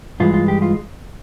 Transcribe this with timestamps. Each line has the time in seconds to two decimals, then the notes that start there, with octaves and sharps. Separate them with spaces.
0.20 G2 E3 G#3 F4
0.34 F4
0.48 G4
0.62 F4